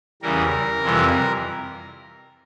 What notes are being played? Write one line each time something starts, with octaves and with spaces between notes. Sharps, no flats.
E2 C#3 E3 G3 A#4
F2 C3 E3 G3